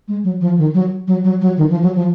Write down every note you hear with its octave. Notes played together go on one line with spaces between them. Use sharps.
G#3
F#3
F3
D#3
F#3
F#3
F#3
F#3
D#3
F3
F#3
F3